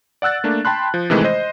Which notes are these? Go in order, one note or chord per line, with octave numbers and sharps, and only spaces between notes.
D5 F#5 E6 F#6 A6
A3 A#3 D4
G5 A5 B5 C6 F#6
F3
C3 D#3 E3 G#3 A3
C5 D#5